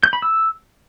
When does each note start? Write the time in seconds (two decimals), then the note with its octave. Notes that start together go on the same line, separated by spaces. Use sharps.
0.03 G6
0.13 B5
0.22 E6